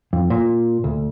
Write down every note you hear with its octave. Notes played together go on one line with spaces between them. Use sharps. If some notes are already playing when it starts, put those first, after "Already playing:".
F2
A#2
D2